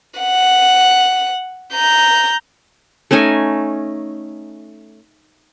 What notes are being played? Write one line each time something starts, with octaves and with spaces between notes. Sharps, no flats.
F#5
A#5 G6
A3 C#4 D#4 G#5